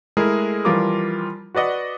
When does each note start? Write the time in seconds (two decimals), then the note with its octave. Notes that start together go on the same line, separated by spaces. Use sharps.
0.17 G#3 A3 E4 G#4 A#4
0.65 E3 F3 G3 F4 A#4 D6
1.55 F#4 B4 D5 D#5 F#5